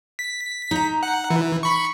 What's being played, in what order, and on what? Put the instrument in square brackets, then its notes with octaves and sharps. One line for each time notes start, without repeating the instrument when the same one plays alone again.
[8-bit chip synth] B6
[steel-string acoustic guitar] D#4 A#5
[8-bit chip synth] F#5
E3
B5 C#6